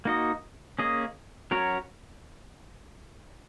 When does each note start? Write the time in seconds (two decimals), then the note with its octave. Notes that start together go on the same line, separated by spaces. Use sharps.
0.05 A#3 D#4 F#4 D#5
0.79 A#3 C#4 G#4 D#5
1.51 F#3 C#4 F#4 A#4 C#5